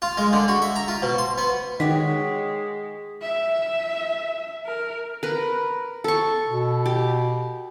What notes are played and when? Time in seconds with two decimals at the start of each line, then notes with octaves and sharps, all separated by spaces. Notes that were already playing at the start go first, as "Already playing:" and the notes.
0.02 F4
0.17 G#3
0.33 D3
0.48 F#4
0.62 E5
0.76 A#5
0.88 F4
1.02 B2
1.18 C6
1.38 B3
1.80 D#3 G#3 F#4 G4 C#5 B6
3.22 E5
4.66 A#4
5.23 A#4 B4
6.04 A4 C#6
6.49 B2
6.86 G4